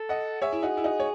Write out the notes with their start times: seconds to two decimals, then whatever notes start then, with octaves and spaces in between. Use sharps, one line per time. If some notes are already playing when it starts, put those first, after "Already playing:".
Already playing: A4
0.09 D#5 F#5
0.42 G#4 C#5 E5
0.53 E4
0.62 D#4 F#4
0.77 E4
0.84 D#4 F#4
1.00 C#5